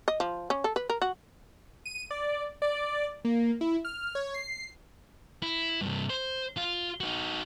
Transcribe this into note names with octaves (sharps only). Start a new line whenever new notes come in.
D#5
F3
C#4
A4
B4
A#4
F#4
D#7
D5
D5
A#3
E4
F6
C#5
C7
E4
G2 C3
C5
F4
D#4 F#4